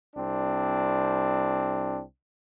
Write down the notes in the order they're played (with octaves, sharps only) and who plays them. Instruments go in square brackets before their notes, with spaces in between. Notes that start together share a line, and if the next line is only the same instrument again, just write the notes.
[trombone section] C2 C4 D4